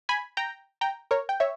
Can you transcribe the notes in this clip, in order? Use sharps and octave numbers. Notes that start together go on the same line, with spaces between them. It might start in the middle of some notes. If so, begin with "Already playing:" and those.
G#5 B5
G5 A#5
G5 A#5
A#4 C#5
G5
C#5 E5